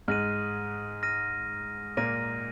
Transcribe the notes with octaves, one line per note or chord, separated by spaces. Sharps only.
G#2 G#3 F6 A#6 D#7
F6 A#6 D#7
A#2 A#3 F6 A#6 D#7